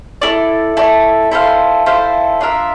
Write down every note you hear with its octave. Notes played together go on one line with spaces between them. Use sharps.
E4 A4 D5
E4 A4 D5
E4 A4 C5 F5
E4 A4 C5 F5
D4 F4 A#4 E5